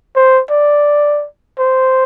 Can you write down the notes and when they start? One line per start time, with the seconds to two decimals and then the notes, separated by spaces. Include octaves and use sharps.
0.16 C5
0.51 D5
1.59 C5